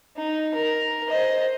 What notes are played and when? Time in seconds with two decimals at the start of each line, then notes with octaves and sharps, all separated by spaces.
0.17 D#4
0.55 A#4
1.08 C5 D#5